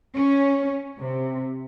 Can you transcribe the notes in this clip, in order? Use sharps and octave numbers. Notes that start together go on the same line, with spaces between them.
C#4
C3